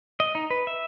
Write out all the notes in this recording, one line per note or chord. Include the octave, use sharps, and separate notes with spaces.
D#5
D#4
B4
E5